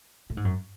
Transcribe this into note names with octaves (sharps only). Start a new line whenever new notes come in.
A2
G#2
F#2